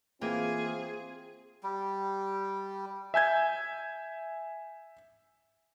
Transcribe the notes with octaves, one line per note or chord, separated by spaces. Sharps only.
E3 A#3 C4 F4 G#4 G5
G3
E5 G#5 G6 G#6